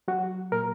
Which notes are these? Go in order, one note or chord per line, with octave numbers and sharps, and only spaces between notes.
F#3 F#4
A#2 A#4